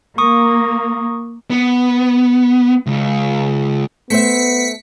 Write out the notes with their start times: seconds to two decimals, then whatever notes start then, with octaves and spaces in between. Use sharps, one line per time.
0.18 A#3 C#6 D#6
1.50 B3
2.87 C#2
4.10 A3 B3 C5 E5 B6 C#7